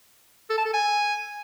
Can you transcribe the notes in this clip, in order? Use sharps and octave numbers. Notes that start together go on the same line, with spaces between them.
A4
A5
A4
G#5